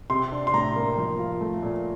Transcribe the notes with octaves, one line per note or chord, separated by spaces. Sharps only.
C3 C6
D4
C6
A2 A#5
A#3
F3
F4
A3
A#2